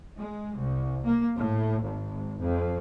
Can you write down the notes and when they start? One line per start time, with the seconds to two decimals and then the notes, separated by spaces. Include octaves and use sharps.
0.17 G#3
0.57 C2
1.05 A#3
1.36 A2
1.81 G#1
2.40 F2